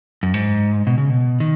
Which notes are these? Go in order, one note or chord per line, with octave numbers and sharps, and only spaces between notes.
F#2
G#2
B2
C#3
B2
D#3